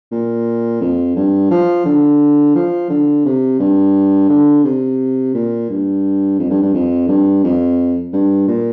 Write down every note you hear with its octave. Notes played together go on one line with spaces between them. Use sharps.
A#2
F2
G2
F3
D3
F3
D3
C3
G2
D3
C3
A#2
G2
F2
G2
G2
F2
G2
F2
G2
A#2